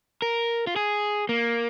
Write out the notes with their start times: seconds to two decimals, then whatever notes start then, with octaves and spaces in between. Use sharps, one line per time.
0.22 A#4
0.67 F4
0.76 G#4
1.29 A#3